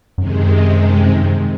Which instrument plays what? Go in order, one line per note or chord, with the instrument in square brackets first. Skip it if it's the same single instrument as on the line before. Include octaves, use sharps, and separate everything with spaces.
[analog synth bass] F#2 [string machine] C3 D#3 G#3